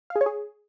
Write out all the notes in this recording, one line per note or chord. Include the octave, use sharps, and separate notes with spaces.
F5
G#4
C#5
G#4